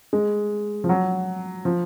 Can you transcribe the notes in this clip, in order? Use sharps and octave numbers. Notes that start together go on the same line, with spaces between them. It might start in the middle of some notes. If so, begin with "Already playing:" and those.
G#3
F3
F#3
F3